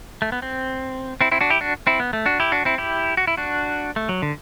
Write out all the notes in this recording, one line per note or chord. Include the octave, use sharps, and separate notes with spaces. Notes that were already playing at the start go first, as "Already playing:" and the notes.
A3
B3
C4
C4 E4
C4 E4
D4 F#4
E4 G4
D4 F#4
C4 E4
B3
A3
D4 F#4
E4 G4
D4 F#4
C4 E4
E4 G4
F#4
E4
D4 F#4
A3
F#3
D3